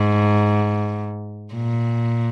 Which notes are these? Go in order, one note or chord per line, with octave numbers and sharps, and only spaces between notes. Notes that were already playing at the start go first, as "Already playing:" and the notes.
Already playing: G#2
A#2